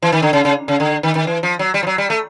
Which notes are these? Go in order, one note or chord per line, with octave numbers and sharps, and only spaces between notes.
E3
D#3
D3
C#3
C#3
C#3
D3
D#3
D#3
E3
F3
F#3
G3
F3
F#3
G3
A3